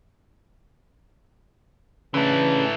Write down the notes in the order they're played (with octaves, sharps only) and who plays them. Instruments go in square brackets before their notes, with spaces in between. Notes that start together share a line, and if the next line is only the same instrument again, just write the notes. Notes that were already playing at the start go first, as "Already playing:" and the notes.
[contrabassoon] C#3 [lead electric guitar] E3 A3 [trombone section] D4 A4 B4